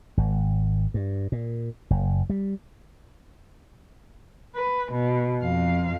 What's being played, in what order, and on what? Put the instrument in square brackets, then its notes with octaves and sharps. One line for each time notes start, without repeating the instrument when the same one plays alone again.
[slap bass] G#1
G2
A#2
F#1
G3
[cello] B4
B2
F2 F5